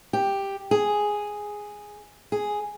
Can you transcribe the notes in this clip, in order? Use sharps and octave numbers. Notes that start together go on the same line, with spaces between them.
G4
G#4
G#4